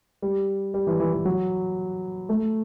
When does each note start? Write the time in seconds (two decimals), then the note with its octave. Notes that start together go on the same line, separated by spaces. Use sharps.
0.22 G3
0.74 G3
0.87 E3
1.00 E3
1.13 E3
1.25 F#3
2.29 A3